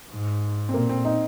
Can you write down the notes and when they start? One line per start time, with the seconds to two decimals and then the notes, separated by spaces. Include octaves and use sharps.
0.11 G#2
0.69 C4
0.74 A#2 A#3
0.89 C4
1.05 D#4